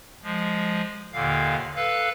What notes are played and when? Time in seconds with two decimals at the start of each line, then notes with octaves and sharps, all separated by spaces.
0.23 F3 G#3
1.13 D#2 A#2 D3 F5
1.76 A4 B4 F5 F#6